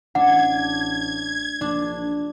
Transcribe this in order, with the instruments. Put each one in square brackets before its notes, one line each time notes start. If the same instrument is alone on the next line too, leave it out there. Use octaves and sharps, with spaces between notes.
[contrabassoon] A1 [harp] D4 [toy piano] F#5 [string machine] G#6
[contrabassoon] A#1 [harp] D4